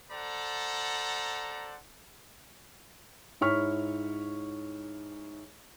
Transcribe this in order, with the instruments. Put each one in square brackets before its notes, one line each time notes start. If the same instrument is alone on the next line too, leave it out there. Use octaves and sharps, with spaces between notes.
[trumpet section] A4 C5 D5 F#5 A#5
[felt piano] G#2 E4 C#5 C#6 F6 B6